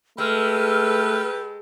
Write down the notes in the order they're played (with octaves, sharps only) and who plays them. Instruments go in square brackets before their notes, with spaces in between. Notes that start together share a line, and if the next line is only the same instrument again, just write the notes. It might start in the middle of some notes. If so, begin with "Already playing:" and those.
[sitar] G#3 [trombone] A3 [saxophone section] G4 A4 B4 [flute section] E6 F6